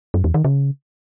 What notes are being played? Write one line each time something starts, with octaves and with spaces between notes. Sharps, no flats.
F#2
E2
D#3
C#3